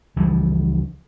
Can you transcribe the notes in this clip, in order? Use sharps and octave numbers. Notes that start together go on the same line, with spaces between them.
C#2 E3 F3 G3